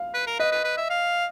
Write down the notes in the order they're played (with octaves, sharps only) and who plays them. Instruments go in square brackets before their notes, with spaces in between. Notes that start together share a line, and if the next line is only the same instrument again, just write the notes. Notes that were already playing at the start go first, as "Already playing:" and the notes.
Already playing: [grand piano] F5
[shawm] B4
A#4
[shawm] B4 [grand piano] D#5
[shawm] B4
B4
E5
F5